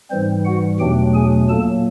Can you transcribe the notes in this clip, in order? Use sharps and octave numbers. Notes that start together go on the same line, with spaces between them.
G#2 E3 G3 C4 C5
F#4 F#5
E2 B2 F#3 A3 D4 G4 G5
G#4 G#5
A#2 F#3 A#3 A4 A5